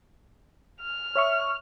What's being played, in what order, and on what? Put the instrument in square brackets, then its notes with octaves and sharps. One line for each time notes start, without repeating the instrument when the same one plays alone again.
[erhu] F6
[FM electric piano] C#5 E5 C#6